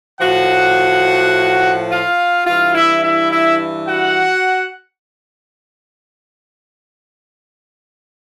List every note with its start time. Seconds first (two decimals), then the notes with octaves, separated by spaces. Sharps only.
0.20 A2 F3 F#4 F#5
1.91 F4 F5
2.47 G2 E3 F4 F5
2.74 E4 E5
3.03 E4 E5
3.31 E4 E5
3.88 F#4 F#5